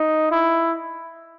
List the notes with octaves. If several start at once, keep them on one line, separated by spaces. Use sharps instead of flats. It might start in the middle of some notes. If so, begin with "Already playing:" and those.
Already playing: D#4
E4